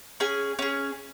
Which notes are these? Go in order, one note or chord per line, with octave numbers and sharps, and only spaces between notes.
C#4 G#4 G#5
C#4 G#4